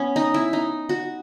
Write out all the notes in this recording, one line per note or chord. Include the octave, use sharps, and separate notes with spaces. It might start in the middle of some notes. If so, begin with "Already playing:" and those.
Already playing: B3 C#4
D#4
E4
D#4
F#4